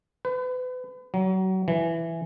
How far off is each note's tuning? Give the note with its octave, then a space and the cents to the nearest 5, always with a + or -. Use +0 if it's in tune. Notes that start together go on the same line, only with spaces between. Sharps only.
B4 +35
F#3 +30
E3 +10